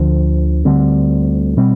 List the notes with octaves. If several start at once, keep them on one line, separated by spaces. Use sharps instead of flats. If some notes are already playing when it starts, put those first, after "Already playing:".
Already playing: D2 D3 F3
D2 D3 G3 C4
B2 G3 C4